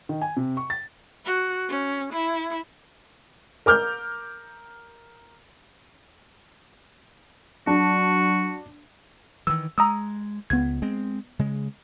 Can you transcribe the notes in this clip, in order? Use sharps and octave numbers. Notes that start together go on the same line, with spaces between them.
D#3
G#5
C3
C#6
A6
F#4
C#4
E4
A#4 D6 F6 G6
F#3 D4 F#4
D#3 E3 E6
G#3 A#5 D#6 E6
C#2 B3 G#6
G#3 C4
C#3 G#3